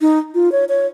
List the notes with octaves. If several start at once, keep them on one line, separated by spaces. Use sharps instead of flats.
D#4
F4
C#5
C#5